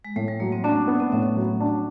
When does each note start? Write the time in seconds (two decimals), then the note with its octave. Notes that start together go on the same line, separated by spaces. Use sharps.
0.05 G#3
0.16 A2 A3
0.28 G3
0.40 F#3 A#3
0.52 C4
0.64 C#4 D4
0.88 B3
1.00 C4
1.12 A2 C#4
1.36 F#3
1.60 D4